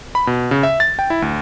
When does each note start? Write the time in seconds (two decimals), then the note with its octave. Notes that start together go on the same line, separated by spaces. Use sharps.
0.15 B5
0.27 B2
0.51 C#3
0.63 E5
0.80 A6
0.99 G5
1.10 E4
1.22 D2